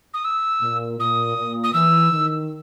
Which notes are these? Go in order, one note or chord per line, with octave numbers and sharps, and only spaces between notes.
D#6
E6
A#2
A#2 D#6
A#2
D#6
E3 E6
D#3